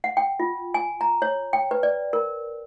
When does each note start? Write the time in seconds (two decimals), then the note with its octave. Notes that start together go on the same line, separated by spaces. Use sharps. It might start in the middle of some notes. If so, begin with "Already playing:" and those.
0.04 F#5
0.17 G5
0.40 F4
0.74 G#5
1.01 A#5
1.22 C#5
1.53 G5
1.71 B4
1.83 D5
2.13 A#4